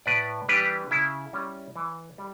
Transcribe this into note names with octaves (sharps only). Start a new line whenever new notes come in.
A2 B4 D5
E3 G3 D4 G4 B4
C#3 E4
G3 C#4
E3
G3